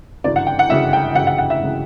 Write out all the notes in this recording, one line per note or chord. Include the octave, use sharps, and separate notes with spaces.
G1 F#2 C#3 E3 D5
F#5
G5
F#5
G1 F#2 C#3 E3 E5
G5
G1 F#2 C#3 E3 F#5
F#5
F#5
E5
C#3 E3